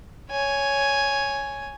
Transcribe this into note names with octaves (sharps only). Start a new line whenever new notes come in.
C#5 G#5